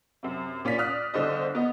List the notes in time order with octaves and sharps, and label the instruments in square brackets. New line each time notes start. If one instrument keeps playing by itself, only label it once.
[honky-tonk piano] F#2 C3
A#2 C#4 F4 D5 B6
D5 D#6 F6 F#6
G1 D3 C5 D#5
B3 D#5